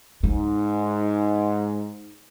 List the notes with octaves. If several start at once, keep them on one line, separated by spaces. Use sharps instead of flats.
G#2 D#4